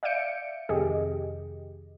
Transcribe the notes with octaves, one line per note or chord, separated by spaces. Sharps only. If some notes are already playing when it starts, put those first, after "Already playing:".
D5 E5 F5 G6 C#7 D7
F2 C3 D#3 G4 G#4 D#5